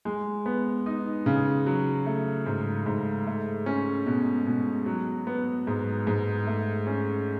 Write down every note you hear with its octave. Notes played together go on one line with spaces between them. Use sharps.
G#3
B3
D#4
C#3
F#3
A3
G#2
G#2
A3
C#4
B2
B2
F#3
B3
G#2
G#2
A3
C#4